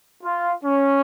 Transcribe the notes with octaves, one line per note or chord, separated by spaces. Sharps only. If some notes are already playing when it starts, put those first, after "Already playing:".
F4
C#4